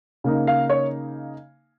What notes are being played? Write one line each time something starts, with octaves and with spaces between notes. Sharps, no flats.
C#3 A#3 D#4
F5
C#5